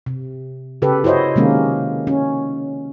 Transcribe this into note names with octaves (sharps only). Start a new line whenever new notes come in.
C3
C#3 G4 A4 B4
E4 F#4 C5 C#5 D#5
C3 D#3 G#3 A#3 C#4
C#4